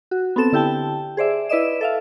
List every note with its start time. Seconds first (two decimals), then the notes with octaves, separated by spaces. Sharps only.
0.11 F#4
0.36 B3 C4 A4 E7
0.52 D3 E4 G4 G5 A5
1.17 G#4 C5 D5 E5
1.49 E4 B4 D5 D#5 E7
1.81 A4 E5 F5